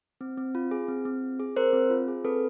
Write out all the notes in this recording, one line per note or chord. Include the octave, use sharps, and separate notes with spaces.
C4
C4
F4
G#4
C4
C4
F4
G#4
C4 A#4 C5
C4
F4
G#4
C4 A4 B4